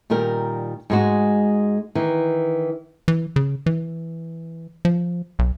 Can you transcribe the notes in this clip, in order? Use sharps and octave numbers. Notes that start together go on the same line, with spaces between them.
A#2 D#3 G3 A#4
G#2 G#3 F#4
D#3 E3
E3
C#3
E3
F3
B1